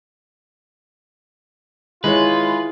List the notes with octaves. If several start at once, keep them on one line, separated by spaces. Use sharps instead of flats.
D#3 G#3 E4 F4 G#4 B4 C#5